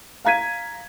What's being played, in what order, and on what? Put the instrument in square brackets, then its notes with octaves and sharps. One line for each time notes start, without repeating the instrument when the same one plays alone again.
[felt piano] F5 A#5 G#6 B6 D#7